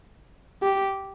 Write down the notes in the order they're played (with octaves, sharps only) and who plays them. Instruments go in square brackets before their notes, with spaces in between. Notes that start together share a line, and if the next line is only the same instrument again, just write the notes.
[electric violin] G4